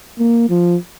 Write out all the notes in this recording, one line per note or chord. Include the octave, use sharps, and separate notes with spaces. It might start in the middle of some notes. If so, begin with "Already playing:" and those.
A#3
F3